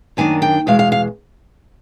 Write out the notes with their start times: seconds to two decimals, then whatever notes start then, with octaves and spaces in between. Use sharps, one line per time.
0.17 F#2 D#3 G3 A#3 D4 G#5
0.42 G5
0.67 E2 B2 G#3 F5
0.79 F5
0.92 F5